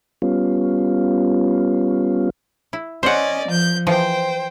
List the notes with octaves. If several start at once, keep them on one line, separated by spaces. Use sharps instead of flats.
G3 B3 C#4 F4
E4
C#4 C5 D5 D#5 F#5
F3 G6
E3 F3 C5 G5